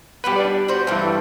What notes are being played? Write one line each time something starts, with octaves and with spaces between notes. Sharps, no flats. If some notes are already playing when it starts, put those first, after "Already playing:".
G3 B3 G4 B4 F#5
D4 D5
F#4 C5
G2 E3 A3 C4